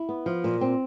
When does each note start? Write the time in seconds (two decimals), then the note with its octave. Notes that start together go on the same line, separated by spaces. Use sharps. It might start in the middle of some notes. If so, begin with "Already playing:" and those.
Already playing: E4
0.09 B3
0.26 F3
0.44 A#2
0.61 C4